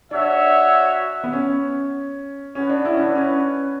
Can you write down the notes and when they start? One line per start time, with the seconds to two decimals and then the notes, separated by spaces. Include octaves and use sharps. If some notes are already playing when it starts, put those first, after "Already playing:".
0.11 D4 F#4 C#5 E5
1.24 B3
1.33 C#4
2.55 B3 C#4 F#4 B4
2.69 D4
2.85 E4
2.94 C#4
3.00 D4
3.15 C#4